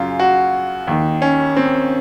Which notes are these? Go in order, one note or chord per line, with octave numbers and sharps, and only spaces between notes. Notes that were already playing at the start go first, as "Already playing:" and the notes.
Already playing: F#2 C#3 F4
F#4
D#2 D#3
C#4
C4